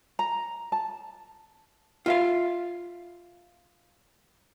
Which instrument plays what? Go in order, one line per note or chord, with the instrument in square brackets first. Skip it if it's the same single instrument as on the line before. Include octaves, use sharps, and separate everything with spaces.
[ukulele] A#5
A5
[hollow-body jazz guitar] F4 E5 F5